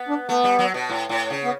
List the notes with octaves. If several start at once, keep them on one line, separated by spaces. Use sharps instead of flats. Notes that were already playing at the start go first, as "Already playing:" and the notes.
Already playing: B3
D4
A3 B3
G3
F#3
B2
A2
A2
C#3
B3